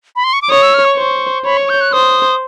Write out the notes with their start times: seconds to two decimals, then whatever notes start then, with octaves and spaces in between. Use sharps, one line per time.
0.16 B5
0.24 C6
0.33 C#6
0.42 D6
0.50 C#5 D#6
0.62 E6
0.74 F6
0.85 C#6
0.98 C5
1.45 C#5 B5
1.57 C#6
1.69 G6
1.81 F#6
1.93 C5 D#6